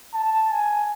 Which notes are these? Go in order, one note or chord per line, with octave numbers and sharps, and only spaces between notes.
A5
G#5